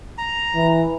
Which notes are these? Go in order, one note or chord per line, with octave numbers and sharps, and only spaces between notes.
A#5
E3